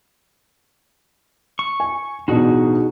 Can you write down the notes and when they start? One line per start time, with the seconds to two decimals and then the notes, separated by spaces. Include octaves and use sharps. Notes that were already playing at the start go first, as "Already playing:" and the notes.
1.59 C#6
1.80 G#5
2.28 A1 B2 D4 D#4 F#4 G#4